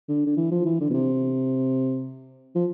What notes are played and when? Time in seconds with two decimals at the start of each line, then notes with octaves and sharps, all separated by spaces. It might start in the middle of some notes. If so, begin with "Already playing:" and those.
0.09 D3
0.27 D3
0.37 E3
0.51 F3
0.65 E3
0.81 D3
0.90 B2
0.94 C3
2.55 F3